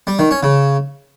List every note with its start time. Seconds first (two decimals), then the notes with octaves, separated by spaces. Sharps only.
0.07 G3
0.19 D#3
0.31 C#4
0.43 C#3